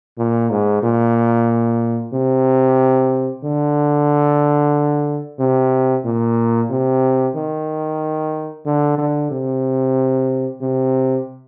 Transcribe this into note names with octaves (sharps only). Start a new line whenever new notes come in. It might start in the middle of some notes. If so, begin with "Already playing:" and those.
A#2
G#2
A#2
C3
D3
C3
A#2
C3
D#3
D3
D3
C3
C3